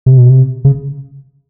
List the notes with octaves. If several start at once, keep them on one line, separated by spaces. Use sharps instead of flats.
C3
B2
C3
C#3